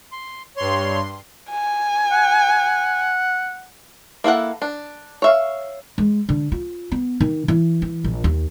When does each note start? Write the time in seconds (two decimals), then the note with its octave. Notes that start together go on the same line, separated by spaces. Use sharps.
0.12 C6
0.57 G2 C#5 C6
1.50 G#5
2.12 F#5
4.24 A#3 E4 A4 F#5
4.62 D4
5.22 C#5 E5 F5
5.98 G#3
6.29 D3
6.52 F4
6.92 B3
7.20 D#3
7.48 E3
7.82 E3
8.04 A#1
8.24 D#2